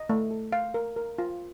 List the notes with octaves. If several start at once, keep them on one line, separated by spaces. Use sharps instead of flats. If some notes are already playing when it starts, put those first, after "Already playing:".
Already playing: D#5
A3
A4
F5
A#4
A#4
F4